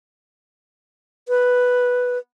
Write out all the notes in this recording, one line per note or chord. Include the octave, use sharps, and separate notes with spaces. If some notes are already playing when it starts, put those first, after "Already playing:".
B4